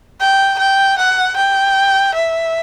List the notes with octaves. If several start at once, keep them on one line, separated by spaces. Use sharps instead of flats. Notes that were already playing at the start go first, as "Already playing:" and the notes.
G5
G5
F#5
G5
E5